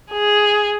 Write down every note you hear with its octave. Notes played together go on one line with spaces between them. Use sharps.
G#4